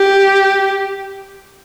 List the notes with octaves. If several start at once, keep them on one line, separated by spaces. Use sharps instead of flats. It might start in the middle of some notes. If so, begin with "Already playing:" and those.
Already playing: G4